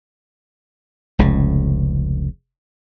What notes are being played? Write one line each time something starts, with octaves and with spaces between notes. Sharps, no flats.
F1 C#2 C#3